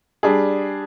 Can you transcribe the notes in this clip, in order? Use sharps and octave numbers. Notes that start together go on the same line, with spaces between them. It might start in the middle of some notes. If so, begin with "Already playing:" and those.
G3 D4 G#4